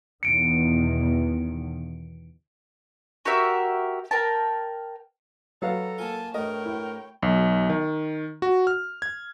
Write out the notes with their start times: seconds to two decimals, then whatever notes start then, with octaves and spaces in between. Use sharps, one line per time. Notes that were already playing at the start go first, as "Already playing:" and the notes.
0.23 E2 B2 D#3 C#7 D7
3.25 F#4 G4 A#4 E5
4.11 A#4 G5 A5
5.62 F#3 A4 B4 F5 A#5
5.98 A#3 F4 G#5 A5
6.34 G2 A3 A#4 C#5 D#5 G5
6.66 E4
7.22 B1
7.70 D#3
8.42 F#4
8.67 F6
9.02 G#6